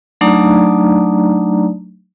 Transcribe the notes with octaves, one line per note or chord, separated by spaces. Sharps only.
F#3 A3 D4 D#4 D5 A#5